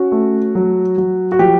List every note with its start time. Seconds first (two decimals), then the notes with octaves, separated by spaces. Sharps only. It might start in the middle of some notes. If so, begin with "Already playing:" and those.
Already playing: C#4 F#4
0.12 A3
0.55 F#3
0.98 F#3
1.32 F#4
1.39 F3 G4